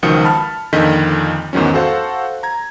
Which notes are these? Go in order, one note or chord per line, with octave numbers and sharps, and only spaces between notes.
C#2 D#3 F3 F#3 D#6 C#7
A5 B5 F6
F2 A#2 D3 D#3 D#5 B6
E2 G#2 D#3 F#3 C#4
F#4 A4 C5 F5 F#5
A#5 G#6